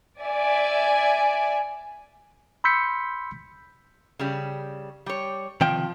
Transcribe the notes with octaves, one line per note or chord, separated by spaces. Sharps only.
D5 E5 G#5
B5 C6 E6 G6 B6 C#7
C#3 G3
G3 C#5
C3 D#3 F3 G5